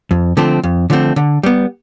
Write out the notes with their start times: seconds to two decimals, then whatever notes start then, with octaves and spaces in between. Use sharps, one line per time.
0.11 F2
0.37 D3 F3 A3 C4
0.63 F2
0.90 D3 F3 A3 C4
1.16 D3
1.43 G3 B3